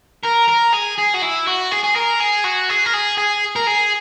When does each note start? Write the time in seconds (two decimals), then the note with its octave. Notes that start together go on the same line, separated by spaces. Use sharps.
0.25 A#4
0.49 A#4
0.74 G#4
0.99 G#4
1.14 F#4
1.22 E4
1.48 F#4
1.72 G#4
1.84 G#4
1.96 A#4
2.20 G#4
2.44 F#4
2.69 G#4
2.86 A#4
2.93 G#4
3.18 G#4
3.56 A#4
3.67 G#4